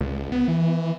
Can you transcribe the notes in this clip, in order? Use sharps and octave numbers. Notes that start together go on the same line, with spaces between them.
C#2
B3
E3